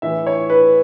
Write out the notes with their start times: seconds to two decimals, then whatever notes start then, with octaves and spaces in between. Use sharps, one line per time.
0.02 A2 E3 E5
0.27 C#5
0.50 B4